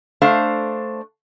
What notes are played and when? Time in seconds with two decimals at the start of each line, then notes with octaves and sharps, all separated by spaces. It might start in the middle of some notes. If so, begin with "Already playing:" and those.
0.22 A3 D4 C5 F5